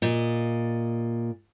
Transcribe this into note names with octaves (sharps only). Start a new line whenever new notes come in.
A#2 D5 D#5